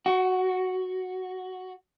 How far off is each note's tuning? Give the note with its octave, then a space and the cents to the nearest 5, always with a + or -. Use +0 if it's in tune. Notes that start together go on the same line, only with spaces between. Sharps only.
F#4 +0 F#5 +35